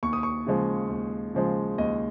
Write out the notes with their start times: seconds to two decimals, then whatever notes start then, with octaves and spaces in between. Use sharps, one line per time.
0.03 D#2 C#6
0.13 D#6
0.23 C#6
0.46 C#3 F3 G#3
0.90 D#2
1.34 C#3 F3 G#3
1.78 D#2 D#5